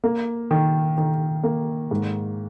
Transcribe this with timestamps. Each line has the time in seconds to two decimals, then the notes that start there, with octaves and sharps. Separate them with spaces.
0.04 A#3
0.51 D#3
0.98 D#3
1.43 A#3
1.91 G#2